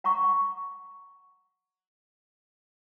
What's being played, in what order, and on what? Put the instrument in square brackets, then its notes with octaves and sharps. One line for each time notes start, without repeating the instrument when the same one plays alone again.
[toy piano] F#5 A#5 C#6